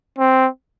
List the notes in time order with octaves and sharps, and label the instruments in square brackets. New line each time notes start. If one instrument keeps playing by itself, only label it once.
[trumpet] C4